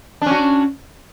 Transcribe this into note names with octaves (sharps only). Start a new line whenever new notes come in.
C#4 D4 F#4